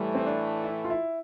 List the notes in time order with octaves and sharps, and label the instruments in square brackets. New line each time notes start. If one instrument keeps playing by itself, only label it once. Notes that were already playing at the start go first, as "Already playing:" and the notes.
Already playing: [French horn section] A2 E3 A3 [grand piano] G3
[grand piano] C4
D4
E4
F4
E4